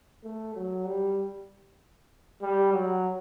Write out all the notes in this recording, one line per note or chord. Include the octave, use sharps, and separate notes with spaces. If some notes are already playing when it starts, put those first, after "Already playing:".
A3
F#3
G3
G3
F#3